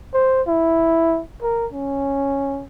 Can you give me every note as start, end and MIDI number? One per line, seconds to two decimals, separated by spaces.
0.14 0.42 72
0.48 1.21 64
1.42 1.67 70
1.73 2.64 61